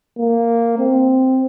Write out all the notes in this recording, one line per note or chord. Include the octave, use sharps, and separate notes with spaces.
A#3
C4